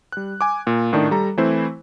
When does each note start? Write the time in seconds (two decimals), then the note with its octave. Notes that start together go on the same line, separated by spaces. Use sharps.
0.12 G3 F#6
0.41 G#5 D6
0.67 A#2
0.93 A2 D#3 D4
1.11 G3 A4 A#5
1.37 E3 A3 C4 E4 C5